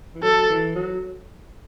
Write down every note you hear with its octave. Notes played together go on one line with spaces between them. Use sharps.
E3
F#3 A4
E3
F#3